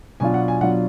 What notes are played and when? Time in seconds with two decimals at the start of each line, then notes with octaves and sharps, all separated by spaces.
0.20 B2 F#3 D4 F4 G#5
0.34 F#5
0.48 G#5
0.61 B2 F#3 D4 F4 F#5